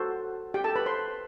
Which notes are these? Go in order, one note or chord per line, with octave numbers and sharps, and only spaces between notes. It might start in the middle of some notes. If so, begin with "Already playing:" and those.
Already playing: F#4 A4 C5
G4 G5
A4 A5
B4 B5
C5 C6